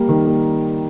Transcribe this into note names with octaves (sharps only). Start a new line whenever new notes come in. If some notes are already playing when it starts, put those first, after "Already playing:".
Already playing: G3 A#3
D#3
A#3